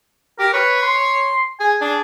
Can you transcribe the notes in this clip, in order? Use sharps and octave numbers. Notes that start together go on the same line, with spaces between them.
G4 A#4
B4 C#5
C6
G#4 G#5
D4 G#4